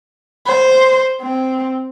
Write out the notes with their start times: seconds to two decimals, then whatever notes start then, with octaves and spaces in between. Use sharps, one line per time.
0.46 C5
1.21 C4